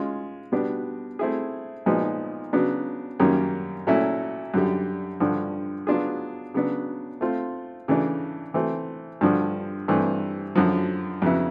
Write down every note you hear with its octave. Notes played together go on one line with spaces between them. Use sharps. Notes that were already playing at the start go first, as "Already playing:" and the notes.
Already playing: G#3 C#4 F4
B2 G3 B3 D4
A3 C4 E4 G#4
A#2 F3 G#3 B3 D#4
C#3 F#3 B3 D4
F#2 D#3 G3 A#3 C#4
A#2 F#3 A3 C#4 E4
F#2 D3 G3
G2 D3 F3
F#3 B3 D4 F4 G#4
C#3 F#3 B3 D4
A3 C4 F4
C#3 E3 A3 D4
E3 A3 C4
G2 D3 F3
G2 E3 A3 C4
F#2 D3 F3
F2 C#3 F#3 B3 E4